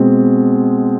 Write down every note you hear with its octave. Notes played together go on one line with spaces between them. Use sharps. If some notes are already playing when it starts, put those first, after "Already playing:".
Already playing: B2 G#3 C4